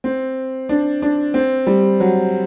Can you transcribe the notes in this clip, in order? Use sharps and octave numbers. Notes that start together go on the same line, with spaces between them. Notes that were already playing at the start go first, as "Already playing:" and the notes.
C4
D4
D4
C4
G3
F#3